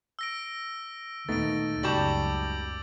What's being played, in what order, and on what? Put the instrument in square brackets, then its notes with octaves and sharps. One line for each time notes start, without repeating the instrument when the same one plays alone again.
[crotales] E6 A#6 D7
[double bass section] D#2 A#2 [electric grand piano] A3 B3 D#4 [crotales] A6 D7
[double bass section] C#2 F#2 [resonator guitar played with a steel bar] G3 F#4 A5 [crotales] D6 G6 F#7